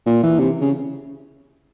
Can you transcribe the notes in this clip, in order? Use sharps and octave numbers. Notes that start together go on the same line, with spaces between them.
A#2
E3
C3
C#3